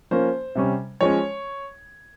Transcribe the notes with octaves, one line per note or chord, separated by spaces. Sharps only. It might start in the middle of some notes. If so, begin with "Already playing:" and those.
F3 A#3 C#4 C5
C3 G3 C#4
F3 G#3 C#4 C#5